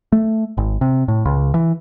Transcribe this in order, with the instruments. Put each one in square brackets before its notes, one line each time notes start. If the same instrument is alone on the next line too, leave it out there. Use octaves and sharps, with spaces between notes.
[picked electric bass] A3
G#1
C3
A2
C#2
E3